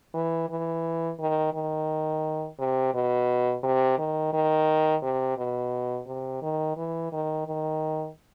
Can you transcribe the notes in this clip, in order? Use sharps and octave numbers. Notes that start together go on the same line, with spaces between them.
E3
E3
D#3
D#3
C3
B2
C3
D#3
D#3
C3
B2
C3
D#3
E3
D#3
D#3